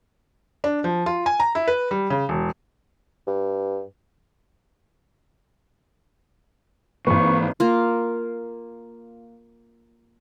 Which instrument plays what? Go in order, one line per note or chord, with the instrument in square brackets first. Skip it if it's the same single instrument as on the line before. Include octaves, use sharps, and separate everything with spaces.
[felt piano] D4
F3
F4
G#5
A#5
E4
B4
G3
C#3
E1
[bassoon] G2
[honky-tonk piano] G#1 B4 [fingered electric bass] E3 A#3 [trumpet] C#6
[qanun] A#3 F4